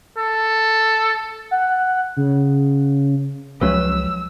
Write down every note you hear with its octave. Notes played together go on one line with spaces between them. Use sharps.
A4
F#5
C#3
C#2 F3 F#3 G#3 C#4 B4 E6